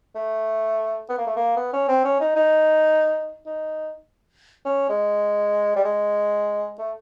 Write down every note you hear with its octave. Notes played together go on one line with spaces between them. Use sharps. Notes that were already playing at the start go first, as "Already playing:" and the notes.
A3
B3
A#3
A3
A#3
B3
C#4
C4
C#4
D#4
D#4
D#4
C#4
G#3
G3
G#3
A3